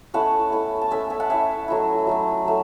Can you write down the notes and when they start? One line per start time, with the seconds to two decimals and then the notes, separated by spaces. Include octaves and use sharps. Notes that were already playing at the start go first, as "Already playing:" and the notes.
0.14 A3 C#4 E4 F#5 A5
0.52 A3 C#4 E4
0.81 A5
0.91 A3 C#4 E4 E5 G#5
1.10 E5 G#5
1.20 F#5 A5
1.29 A3 C#4 E4 E5 G#5
1.68 F#3 A3 E4
2.07 F#3 A3 E4
2.45 F#3 A3